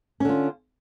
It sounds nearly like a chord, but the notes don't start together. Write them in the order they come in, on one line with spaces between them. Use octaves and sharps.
C#4 D3 F4